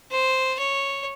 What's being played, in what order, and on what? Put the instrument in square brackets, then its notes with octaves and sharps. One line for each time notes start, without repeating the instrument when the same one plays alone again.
[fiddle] C5
C#5